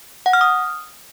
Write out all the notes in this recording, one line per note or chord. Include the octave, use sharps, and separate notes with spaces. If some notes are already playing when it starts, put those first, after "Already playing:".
F#5
F6
D#6